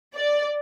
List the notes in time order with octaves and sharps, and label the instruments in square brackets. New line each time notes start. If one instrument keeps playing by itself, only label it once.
[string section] D5